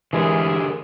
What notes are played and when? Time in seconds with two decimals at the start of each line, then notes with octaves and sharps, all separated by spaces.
0.13 D3 E3 G#3 G4 G#4 A#4